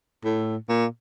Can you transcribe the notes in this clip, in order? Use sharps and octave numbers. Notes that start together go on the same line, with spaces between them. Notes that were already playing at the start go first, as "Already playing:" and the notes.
A2
A#2